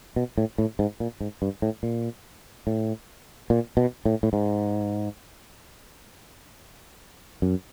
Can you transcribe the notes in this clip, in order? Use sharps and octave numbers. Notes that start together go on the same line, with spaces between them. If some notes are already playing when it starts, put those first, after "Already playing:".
B2
A2
A2
G#2
A#2
G#2
G2
A2
A#2
A2
A#2
B2
A2
A2
G#2
F#2